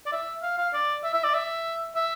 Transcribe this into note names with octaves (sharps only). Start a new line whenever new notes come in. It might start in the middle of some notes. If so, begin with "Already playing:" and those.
D5
E5
F5
F5
D5
E5
E5
D5
E5
E5